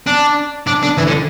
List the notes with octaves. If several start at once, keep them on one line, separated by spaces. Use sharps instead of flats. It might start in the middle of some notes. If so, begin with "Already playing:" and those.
D4
D4
D4
E3
D3